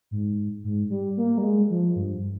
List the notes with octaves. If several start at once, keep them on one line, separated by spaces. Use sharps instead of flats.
G#2
G#2
G3
A#3
G3
G#3
F3
G2